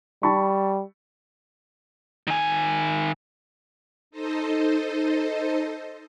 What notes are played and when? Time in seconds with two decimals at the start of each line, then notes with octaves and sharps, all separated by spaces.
0.23 G3 A5 B5 C#6
2.27 D#3 G#5
4.11 D#4 A4 C5 D#5